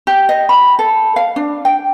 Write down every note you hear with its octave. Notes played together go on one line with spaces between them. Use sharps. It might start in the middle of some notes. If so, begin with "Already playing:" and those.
G4
D#5
B5
A4
F5
D4
G5